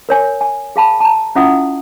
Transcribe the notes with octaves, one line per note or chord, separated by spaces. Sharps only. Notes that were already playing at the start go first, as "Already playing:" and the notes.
A#4 C#5 G#5
G#5
G#4 F5 A5 B5
A5 A#5
C#4 E4 F4 E5 F#5 D#6